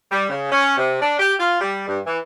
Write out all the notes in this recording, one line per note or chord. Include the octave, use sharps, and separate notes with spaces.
G3
C#3
C#4
C3
D4
G4
F4
G3
G2
E3